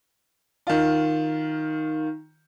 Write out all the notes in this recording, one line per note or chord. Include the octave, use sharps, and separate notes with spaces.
D#3 F4